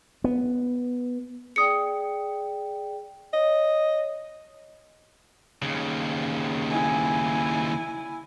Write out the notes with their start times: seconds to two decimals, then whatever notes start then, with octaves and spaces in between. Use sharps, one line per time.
0.24 B3
1.56 G#4 D5 G5 D#6 C#7
3.34 C#5 D#5
5.62 D#2 C#3
6.70 E4 G#5